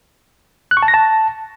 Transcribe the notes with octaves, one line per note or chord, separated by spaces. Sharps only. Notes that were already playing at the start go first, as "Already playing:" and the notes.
F#6
C#6
A5
A#6
A5